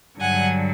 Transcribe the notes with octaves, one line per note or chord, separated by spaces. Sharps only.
G2 D3 F#3 F#5 G#5